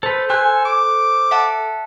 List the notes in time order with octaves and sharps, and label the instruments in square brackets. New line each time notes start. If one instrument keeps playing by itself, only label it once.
[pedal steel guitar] A4 B4 [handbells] C5
[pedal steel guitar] A4 C6 F#6 [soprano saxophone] G#5
[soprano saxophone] D6
[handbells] E5 F#5 A5